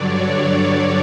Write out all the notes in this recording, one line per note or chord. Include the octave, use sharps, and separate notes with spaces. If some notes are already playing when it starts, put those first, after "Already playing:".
Already playing: G2 D3 F#3 C#5 D5
D5